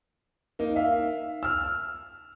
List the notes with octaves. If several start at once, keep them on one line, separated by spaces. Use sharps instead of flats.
A#3 D#4
E5 F5
E6 F6